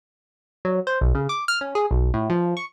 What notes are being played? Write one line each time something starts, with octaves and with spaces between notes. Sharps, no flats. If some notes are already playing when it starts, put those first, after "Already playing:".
F#3
C5
B1
C#3
D6
F6
C#4
G#4
B1
A2
F3
C#6